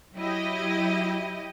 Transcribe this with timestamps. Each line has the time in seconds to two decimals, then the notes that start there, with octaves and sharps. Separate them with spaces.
0.16 F#3 E4 G4 D#5